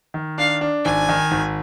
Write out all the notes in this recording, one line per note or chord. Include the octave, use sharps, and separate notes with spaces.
D#3
D4 F5
D4
G#1 G#5
D#3
G#1